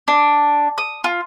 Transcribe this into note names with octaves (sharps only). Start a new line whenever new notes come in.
D4
D#6
F4